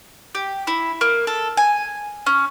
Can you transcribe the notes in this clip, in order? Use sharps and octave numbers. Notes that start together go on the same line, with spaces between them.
G4
E4
A#3
A4
G#5
C#4